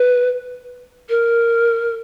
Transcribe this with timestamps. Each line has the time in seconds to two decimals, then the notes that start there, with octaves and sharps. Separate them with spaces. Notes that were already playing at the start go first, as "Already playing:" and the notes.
Already playing: B4
1.09 A#4